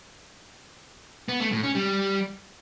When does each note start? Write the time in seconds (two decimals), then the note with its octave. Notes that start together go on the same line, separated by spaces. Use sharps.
1.28 B3
1.40 A3
1.52 A2
1.63 C#4
1.75 G3